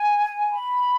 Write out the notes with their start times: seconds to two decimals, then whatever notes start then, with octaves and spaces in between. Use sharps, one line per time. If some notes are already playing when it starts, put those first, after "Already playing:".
Already playing: G#5
0.51 B5